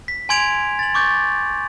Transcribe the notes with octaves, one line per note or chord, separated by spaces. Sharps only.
B6
G#5 C6 G#6 D7 F7
A6 F#7
C#6 D6 G6 A6